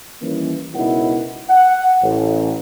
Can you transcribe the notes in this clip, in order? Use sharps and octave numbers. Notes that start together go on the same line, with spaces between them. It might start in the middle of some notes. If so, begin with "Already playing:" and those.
D#3 E3 G3 A#3 C#4
C#2 B2 D#4 E4 A#4 F#5
F#5
A1